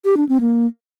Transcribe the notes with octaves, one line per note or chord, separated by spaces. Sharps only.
G4
D4
C4
A#3